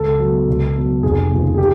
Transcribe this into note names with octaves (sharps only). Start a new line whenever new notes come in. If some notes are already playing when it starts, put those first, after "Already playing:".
Already playing: C#2 A4
B2 F#3
C#2
B2 F#3
F1 G#4
D#2 C#3 F3
G#4
G4